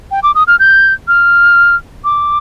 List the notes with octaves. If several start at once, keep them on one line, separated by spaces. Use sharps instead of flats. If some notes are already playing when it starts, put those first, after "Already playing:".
G5
D6
D#6
F6
G6
F6
D6